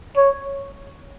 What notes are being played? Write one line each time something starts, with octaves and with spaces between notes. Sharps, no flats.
C#5